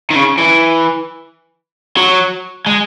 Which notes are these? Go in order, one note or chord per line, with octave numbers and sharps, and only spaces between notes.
D#3
C#3
E3
F#3
G#3